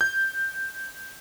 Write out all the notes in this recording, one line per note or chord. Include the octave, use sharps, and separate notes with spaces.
G6